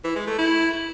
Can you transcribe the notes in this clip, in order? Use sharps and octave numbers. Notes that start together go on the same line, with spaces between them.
E3
G#3
A3
E4